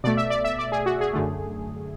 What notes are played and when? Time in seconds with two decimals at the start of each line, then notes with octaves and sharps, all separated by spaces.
0.04 B2 A3 D5
0.17 E5
0.30 D5
0.44 E5
0.59 D5
0.72 G#4
0.86 F#4
1.01 G#4
1.13 F#2 D3 A3